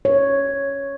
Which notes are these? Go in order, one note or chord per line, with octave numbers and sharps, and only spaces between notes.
C#5